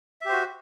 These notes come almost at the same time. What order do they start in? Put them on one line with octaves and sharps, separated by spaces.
E5 G4 C5 F#4